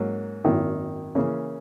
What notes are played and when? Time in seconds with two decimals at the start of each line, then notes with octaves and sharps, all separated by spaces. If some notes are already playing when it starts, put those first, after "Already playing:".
Already playing: G#2 F#3 A#3 C#4
0.44 G#1 F#2 D#3 A#3 E4
1.15 C#3 E3 A#3 C#4 G#4